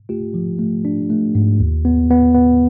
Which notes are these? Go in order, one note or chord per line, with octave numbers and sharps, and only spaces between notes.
A3 F4 G4
F3
A3
D4
A3
G#2
D#2
B3
B3
B3